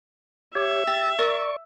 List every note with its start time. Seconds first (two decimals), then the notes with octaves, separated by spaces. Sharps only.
0.55 G4 C#5 E5
0.87 G4 A6
1.19 A#4 D5 C#6